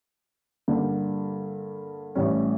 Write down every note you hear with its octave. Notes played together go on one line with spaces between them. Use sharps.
G2 D3 G3 A#3
A1 A2 G3 C#4